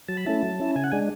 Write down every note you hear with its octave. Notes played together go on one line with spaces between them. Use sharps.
F#3 A5
B5
A3 C#4 E4 A5
F#3
C#4 E4
C#3 G#5
F#5
G#3 D4 G#5